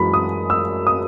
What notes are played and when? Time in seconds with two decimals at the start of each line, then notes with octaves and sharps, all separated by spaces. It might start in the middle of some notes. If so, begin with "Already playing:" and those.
Already playing: F#2 E3 G#3 B5
0.14 D#6
0.50 E6
0.87 D#6